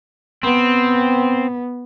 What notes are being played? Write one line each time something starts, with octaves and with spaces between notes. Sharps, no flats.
B3 C4